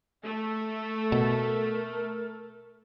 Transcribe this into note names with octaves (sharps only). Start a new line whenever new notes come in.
A3 A4
B2 A#4